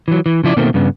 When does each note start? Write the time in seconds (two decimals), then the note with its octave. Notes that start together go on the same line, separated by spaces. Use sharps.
0.08 E3 F#3
0.26 E3
0.44 C#3 F3 E4 D5
0.57 B2 D#3 A3 A#3 C4
0.74 G2 C#3 B3